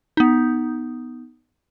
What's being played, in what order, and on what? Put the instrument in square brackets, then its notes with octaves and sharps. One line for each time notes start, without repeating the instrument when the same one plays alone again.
[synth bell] B3 D#4